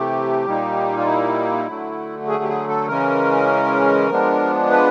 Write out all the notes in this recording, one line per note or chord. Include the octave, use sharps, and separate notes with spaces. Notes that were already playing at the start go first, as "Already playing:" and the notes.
Already playing: C3 E3 A3 G4
A#2 G3 A#3 D#4
F4
E4
D3 F#3 A3
G#4
G4
G#4
A4
C#3 E3 G#3 C#4 A#4
F3 G#3 B3 D4
B4